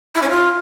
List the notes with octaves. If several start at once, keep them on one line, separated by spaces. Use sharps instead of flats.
E4
C#4
F4